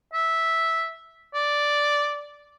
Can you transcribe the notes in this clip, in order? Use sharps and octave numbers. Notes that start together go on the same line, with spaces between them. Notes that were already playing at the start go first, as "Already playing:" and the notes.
E5
D5